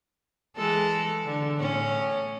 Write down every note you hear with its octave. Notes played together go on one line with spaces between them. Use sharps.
E3 G#3 A4
D3
A2 C#4